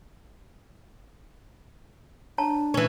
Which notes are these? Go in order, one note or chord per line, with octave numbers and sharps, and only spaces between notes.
D4 C#5 A5 A#5
E3 C#4